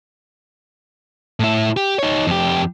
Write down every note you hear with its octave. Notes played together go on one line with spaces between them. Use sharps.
A2 E4
G4
D#4 C#5
F2 G4